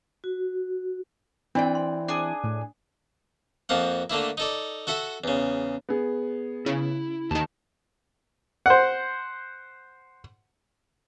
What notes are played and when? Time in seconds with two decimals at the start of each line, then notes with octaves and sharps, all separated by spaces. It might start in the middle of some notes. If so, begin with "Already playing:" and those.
0.24 F#4
1.55 E3 C4 D4 D5 G5
1.75 C6
2.08 D4 G#4
2.44 A2
3.69 F2 F3 A#3 F#5
4.10 D3 A3 A#3 E4
4.37 D#4 A4 D5
4.87 F#4 A4 E5 F#5
5.24 E2 C#3
5.89 B3 G#4
6.66 C#3 E4
7.31 D#2 D#3 A5
8.66 C5 F#5